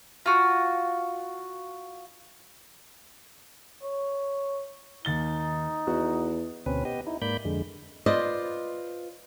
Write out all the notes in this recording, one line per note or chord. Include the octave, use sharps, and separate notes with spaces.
F4 F#4
C#5
D#2 D#4 A6 G7
E2 F#4
D2 B2 C4 C#4 B4
B3 G4 D#5
D#4 E4
G#2 A#3 D5 B5 G6
F2 D3 G#3
F4 B4 C5 D5 D#5